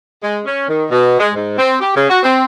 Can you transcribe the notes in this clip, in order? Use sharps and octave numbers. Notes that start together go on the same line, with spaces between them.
G#3
C#4
D#3
B2
G#3
G#2
C4
G4
C#3
F#4
C4